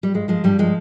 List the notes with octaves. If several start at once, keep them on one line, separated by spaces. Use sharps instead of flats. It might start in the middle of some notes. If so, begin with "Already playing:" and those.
G3
G2 G#3
F3 G#3
G2 G3
F3 G#3